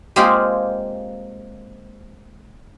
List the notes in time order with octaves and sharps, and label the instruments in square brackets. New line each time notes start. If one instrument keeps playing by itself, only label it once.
[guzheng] G#3 A#3 C4 F4 G4 G#4